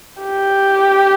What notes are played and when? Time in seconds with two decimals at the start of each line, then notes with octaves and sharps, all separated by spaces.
0.23 G4